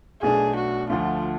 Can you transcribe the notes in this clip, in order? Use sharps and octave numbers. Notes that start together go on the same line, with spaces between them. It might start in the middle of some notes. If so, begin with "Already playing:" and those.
B1 B2 A3 D4 G#4
F#4
D2 D3 F3 A3 F4